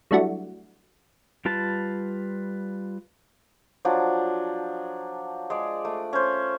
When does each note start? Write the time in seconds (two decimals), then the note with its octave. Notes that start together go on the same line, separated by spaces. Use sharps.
0.11 F#3 G3 A3 D4 E4 F#4
1.45 G3 F4 B4 A5
3.85 F3 F#3 D4
5.50 G#3 D5
5.85 A3
6.13 C#4 C5